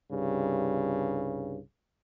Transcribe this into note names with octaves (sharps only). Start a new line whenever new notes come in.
C2 G2 C#3